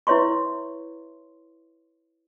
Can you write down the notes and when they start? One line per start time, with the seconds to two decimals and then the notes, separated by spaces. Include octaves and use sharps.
0.07 E4 B4 C#5 E5 C6 C#6